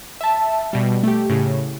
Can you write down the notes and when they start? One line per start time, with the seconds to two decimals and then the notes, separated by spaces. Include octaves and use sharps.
0.21 E5 A5
0.73 B2 G3
1.03 A3 G4
1.30 A2 C#3